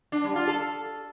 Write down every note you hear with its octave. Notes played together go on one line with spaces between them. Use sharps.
D4
G3
F4
A4